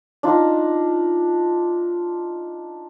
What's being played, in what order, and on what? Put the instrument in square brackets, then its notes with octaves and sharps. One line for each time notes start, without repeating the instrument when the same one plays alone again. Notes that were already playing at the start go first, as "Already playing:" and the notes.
[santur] D4 D#4 F4